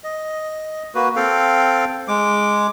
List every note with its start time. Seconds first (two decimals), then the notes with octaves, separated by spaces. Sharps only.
0.04 D#5
0.95 A#3 F#4 B4
1.16 C4 A4 F5 G5
2.08 G#3 D6